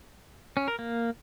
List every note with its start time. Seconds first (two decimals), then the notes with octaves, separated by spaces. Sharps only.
0.57 C#4
0.68 A#4
0.79 A#3